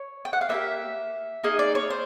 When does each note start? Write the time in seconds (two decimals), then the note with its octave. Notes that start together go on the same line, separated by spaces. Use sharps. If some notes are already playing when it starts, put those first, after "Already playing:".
Already playing: C#5
0.25 G5
0.33 F#5
0.41 F5
0.49 A#3 D#4 G4 E5
1.43 A#3 D#4 G#4 D#5
1.59 D5
1.75 C#5
1.90 C5